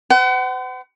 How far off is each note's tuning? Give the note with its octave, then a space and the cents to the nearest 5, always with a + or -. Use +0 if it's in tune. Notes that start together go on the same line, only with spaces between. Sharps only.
C5 -45 F#5 +35